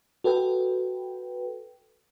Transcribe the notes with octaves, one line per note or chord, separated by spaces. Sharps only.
F#4 A4 B4 G5